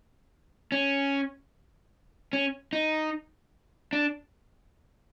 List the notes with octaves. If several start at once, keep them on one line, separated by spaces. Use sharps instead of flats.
C#4
C#4
D#4
D4